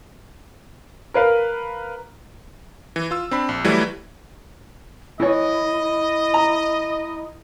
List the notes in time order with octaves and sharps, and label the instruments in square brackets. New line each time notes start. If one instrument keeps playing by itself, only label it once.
[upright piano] A#4 B4 F5
[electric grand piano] E3
F4 E6
C4 D4 B5
A#1
E3 F#3 G3 A3 E4 B4
[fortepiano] E3 C#5 [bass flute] E4 [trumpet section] D#5
[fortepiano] A#5